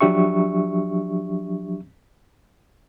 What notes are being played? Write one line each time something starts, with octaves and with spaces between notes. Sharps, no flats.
F3 F#3 D4 G4 E5 C#6